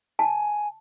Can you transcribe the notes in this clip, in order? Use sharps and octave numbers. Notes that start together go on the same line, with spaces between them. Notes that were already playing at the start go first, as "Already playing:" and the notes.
G#5 A5